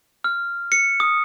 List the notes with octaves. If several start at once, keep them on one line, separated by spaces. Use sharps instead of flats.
F6
C#7
D#6